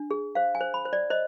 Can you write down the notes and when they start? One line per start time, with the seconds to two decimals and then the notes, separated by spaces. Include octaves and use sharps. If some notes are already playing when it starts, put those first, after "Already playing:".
Already playing: D4
0.11 G#4
0.35 C5 F5
0.55 G#5
0.61 C5
0.74 B5
0.85 C5
0.93 D5
1.10 C5 D#5